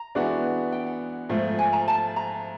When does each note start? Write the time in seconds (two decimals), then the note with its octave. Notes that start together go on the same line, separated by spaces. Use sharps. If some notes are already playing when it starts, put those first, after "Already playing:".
Already playing: A#5
0.15 E3 G#3 B3 D4 F#4
0.72 G5
0.87 F#5
1.29 G#2 F3 A3
1.59 G#5
1.73 A#5
1.88 A5
2.16 A#5